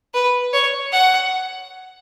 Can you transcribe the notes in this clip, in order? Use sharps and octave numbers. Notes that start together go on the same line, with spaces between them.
B4
C#5
F#5